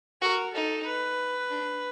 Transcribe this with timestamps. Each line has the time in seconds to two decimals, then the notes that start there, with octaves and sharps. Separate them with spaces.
0.22 F#4 A#4
0.54 D#4 A4
0.86 B4
1.51 D4